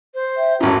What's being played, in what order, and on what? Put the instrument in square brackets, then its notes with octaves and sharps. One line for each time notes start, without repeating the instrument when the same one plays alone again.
[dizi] C5
[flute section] E5 G5
[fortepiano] G#1 A2 [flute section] C#4 A#5 G#6 [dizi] F#4